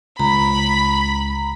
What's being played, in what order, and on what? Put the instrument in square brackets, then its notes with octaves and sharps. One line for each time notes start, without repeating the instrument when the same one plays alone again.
[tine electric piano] C#2 [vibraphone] A#5 [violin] B5